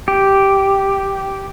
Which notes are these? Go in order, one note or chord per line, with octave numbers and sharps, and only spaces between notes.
G4